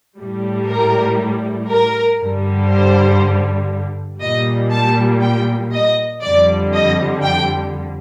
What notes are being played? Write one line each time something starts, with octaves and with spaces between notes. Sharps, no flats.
A2 G3
A#4
A#4
G2 D3 G3
C5
A#2 G3 D#5
A5
G5
D#5
F2 D3 G3 D5
D#5
G5